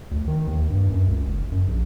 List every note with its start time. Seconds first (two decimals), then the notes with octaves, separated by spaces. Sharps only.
0.11 D2
0.28 D#3
0.47 D#2
0.70 G2
0.90 F#2
1.08 C#2
1.27 F#1
1.52 F#2
1.68 A#1